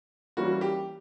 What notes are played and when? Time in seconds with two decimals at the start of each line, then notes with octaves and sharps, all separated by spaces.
0.37 E3 G3 A#3 C#4 F#4
0.61 G4